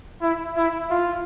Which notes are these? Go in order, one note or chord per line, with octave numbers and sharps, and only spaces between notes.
E4
E4
F4